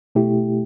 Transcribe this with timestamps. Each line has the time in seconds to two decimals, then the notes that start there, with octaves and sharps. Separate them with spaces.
0.15 B2 A3 E4 G4